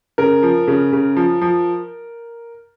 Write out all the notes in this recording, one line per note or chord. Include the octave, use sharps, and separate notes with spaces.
C#3 A#4
F3
C#3
C#3
F3
F3